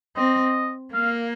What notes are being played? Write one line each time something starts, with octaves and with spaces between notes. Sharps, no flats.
C4 D#5
A#3 F5